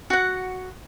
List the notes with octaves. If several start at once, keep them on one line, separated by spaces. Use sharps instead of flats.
F#4 F#5